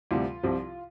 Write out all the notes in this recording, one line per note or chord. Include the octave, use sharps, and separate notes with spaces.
D2 C3 E3 G3 F4
C2 C3 F3